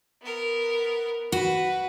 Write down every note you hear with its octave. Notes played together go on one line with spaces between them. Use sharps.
B3 A#4
F#4 B4